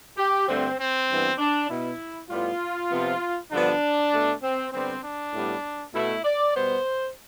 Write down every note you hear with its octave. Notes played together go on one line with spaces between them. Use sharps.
G4
G2 D3 A3 C4
C4
G2 E3 B3
D4
B2 B3 E4
A2 G3 B3 F4
C3 F3 B3
G2 D3 F3 B3 D4
B2 A3
C4
D3 G3 B3 C4
D4
A2 G3 B3
B2 A3 E4
D5
B2 G3 B3 C5